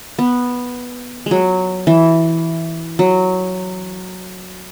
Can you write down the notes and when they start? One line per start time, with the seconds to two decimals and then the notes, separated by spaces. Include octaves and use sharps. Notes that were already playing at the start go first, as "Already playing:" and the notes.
0.19 B3
1.26 F#3 G#3
1.87 E3
2.99 F#3